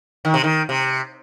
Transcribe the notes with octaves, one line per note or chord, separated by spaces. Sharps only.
D#3
C3
D#3
C3